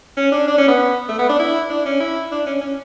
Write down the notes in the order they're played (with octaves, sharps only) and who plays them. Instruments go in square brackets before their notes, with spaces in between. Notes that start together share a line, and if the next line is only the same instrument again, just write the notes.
[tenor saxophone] C#4
D4
D4
C#4
B3
A3
B3
D4
E4
D4
C#4
E4
D4
C#4
C#4